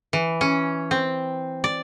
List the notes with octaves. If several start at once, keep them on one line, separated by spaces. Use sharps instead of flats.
E3
C#4
C4
D5